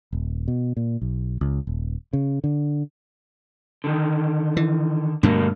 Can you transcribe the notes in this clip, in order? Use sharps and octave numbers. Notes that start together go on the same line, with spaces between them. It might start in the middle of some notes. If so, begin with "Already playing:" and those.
D#1
B2
A#2
B1
C#2
D#1
C#3
D3
D3 D#3
E3
G2 B2 D3 A3 A#3